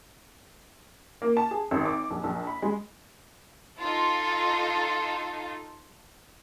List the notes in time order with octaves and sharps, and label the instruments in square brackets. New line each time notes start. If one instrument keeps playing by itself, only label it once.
[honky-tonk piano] A#3
A5
G#4
G#1
D6
A#1
A#1
B5
G#3
[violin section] D#4 F4 A4